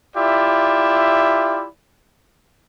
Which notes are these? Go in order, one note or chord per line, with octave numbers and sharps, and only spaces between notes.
E4 F4 G4 D5 E5